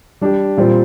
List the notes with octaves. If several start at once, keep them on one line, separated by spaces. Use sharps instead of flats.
G3 D4 G4
A#2 G3 C4 F4